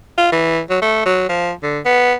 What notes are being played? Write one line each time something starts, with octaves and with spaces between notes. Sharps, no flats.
F4
E3
F#3
A3
F#3
F3
D3
B3